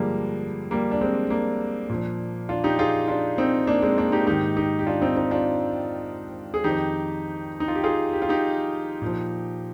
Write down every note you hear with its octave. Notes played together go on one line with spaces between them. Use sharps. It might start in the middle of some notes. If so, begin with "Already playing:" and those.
Already playing: G2 D3 F3 G3 G#3 A#3
G3 A#3
D4
G#3 C4
A#3 D4
A#2 F3
D4 F4
D#4 G4
F4 G#4
D4 F4
C4 D#4
A#3 D4
G#3 C4
A#3 D4
D#4 G4
G#2 D#3 D#4 G4
D#4 G4
G4
D4 F4
C4 D#4
C4 D#4
D4 F4
G#4
F2 D#3 D#4 G4
D#4
F4
G4
F4 G#4
G4
F4
D#4 G4
A#2 F3